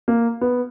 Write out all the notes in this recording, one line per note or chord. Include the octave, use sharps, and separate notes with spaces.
A#3
B3